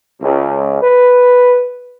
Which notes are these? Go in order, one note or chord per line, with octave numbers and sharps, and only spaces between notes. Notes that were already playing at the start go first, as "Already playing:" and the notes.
C#2
B4